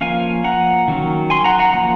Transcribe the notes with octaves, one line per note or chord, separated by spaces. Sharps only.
F3 A#3 C#4 F5 G#5
F#5 A#5
D#3 F#3 C#4
G#5 C6
F#5 A#5
F#5 A#5
F3 A#3 C#4 F#5 A#5